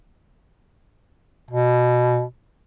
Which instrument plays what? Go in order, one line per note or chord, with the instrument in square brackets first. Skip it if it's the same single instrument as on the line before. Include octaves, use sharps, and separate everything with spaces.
[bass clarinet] B2